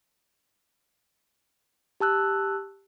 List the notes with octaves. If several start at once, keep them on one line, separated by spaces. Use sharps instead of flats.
G4 A5 E6 F#6